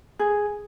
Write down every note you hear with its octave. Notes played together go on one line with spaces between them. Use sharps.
G#4